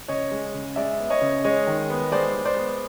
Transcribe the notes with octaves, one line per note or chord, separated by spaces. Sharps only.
C#3 C#5 D#5
G#3
C#3
G#3 D5 E5
B3
C#5 D#5
C#3
G#3 C#5 D#5
D#3
B3
G#3 C5 D5
G#3
C5 D5
B3